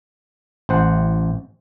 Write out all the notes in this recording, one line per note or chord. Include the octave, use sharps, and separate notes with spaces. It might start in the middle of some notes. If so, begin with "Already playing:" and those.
A1 C5 F#5